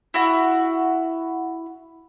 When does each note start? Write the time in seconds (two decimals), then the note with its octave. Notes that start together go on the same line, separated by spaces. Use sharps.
0.14 E4 F#4 F#5